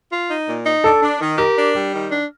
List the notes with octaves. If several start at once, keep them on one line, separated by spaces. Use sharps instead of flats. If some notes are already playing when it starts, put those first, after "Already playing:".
F4
D#4
A#2
D#4
D4 A4
D4
D#3
G4 A#4
D4
G3
D#3
D4